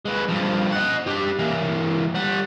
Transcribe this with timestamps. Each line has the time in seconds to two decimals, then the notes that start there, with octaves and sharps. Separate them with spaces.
0.05 G#3 B4
0.29 G2 F3
0.72 D#5 F#5
1.07 D4 G4
1.39 E3 A#3
2.14 G3 F#5